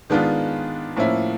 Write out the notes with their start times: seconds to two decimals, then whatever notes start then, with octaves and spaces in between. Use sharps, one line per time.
0.10 D#3 G#3 B3 D4 F4
0.96 A2 F3 A#3 C#4 E4